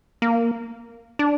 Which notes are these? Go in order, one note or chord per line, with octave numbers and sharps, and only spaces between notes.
A#3
D4